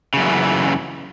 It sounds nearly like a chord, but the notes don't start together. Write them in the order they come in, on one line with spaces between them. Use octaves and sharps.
C#3 F#2 E3